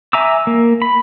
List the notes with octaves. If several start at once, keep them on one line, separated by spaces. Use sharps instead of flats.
E5 G#5 A#5 D6 E6
A#3
B5